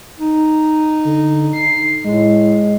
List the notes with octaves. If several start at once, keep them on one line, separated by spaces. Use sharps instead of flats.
D#4
D3
C7
A2 G#3